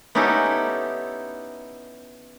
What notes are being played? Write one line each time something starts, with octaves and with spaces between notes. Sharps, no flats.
B3 C#4 D#4 E4 G4 A4